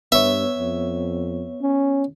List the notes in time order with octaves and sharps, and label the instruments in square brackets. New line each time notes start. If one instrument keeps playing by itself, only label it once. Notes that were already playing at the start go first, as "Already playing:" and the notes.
[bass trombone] G2 [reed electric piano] B3 C#5 [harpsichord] E5
[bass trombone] F2
C#4